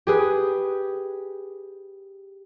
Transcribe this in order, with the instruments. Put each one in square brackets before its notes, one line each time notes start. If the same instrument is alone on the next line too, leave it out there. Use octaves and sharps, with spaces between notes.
[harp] G4 G#4 B4